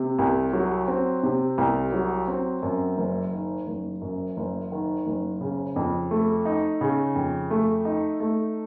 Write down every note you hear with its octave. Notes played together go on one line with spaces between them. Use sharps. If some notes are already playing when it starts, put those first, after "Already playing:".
Already playing: C3
C2
F#3
C4
C3
C2
F#3
C4
F#2
F#1
D#3
F#1
F#2
F#1
D#3
F#1
C#3
F2
A3
D#4
C#3
F2
A3
D#4
A3